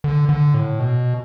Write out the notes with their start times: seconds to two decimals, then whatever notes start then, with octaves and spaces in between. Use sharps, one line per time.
0.04 D3
0.29 D3
0.54 A2
0.80 B2